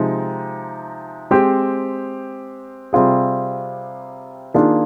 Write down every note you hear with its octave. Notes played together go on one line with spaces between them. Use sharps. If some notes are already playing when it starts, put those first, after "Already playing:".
Already playing: C3 F3 G#3 D#4
G#3 C4 G4 C5
C3 G3 C4 F4 G#4
D#3 A#3 D4 F4 G#4